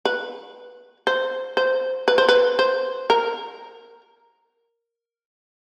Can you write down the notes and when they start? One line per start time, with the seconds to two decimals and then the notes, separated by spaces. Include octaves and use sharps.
0.05 B4
1.07 C5
1.57 C5
2.08 B4
2.18 C5
2.29 B4
2.59 C5
3.10 A#4